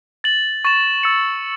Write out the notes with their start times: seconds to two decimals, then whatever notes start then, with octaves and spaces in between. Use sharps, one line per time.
0.24 A6 F#7
0.65 C#6 A6 E7
1.03 E6 A6 C#7